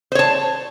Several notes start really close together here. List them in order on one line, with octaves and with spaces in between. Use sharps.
C5 C#5 A5